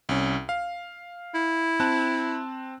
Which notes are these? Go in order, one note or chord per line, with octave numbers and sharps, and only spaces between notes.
C2 C#4
F5
E4
C4 A5 F#6